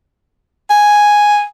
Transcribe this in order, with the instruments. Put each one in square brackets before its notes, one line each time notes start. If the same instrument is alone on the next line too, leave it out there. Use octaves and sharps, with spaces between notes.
[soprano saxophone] G#5